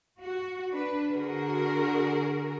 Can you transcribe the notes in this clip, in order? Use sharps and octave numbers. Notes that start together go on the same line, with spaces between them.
F#4
D4 B4
D3 F#4 G#4 A#4